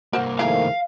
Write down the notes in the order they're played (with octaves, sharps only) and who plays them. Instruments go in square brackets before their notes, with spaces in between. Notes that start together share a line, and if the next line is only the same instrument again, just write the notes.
[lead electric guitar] C2 A#3 [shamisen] A#4 C5 F#5
[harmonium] D#3 F3 A3 [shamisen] E4 G#4 A#4 [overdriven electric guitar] F5